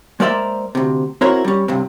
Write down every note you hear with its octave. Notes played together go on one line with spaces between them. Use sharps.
G#3 A#3 A#4 C5 D5 E5
D2 C3
C4 E4 F#4 A#4 C5 C#5
G3 C#4
C#2 G2 C3